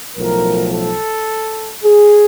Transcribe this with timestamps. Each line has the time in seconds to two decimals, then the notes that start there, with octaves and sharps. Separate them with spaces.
0.17 B1 A2 F3 A#4
0.73 A4
1.85 G#4